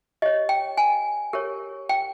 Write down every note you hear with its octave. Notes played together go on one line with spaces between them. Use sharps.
G4 C#5 D#5
G5
G#5
G4 A#4 C#5
G5